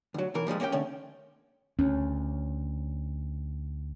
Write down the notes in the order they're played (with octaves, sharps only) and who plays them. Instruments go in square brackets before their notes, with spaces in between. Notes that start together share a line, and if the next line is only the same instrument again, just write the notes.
[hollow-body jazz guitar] D2 F#3
B1 E3 A#4
A#2 F3 G3 G#3
A#3 C#4 G4 C5 G5
D3 A3 C#4
[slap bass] D2 [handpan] C#4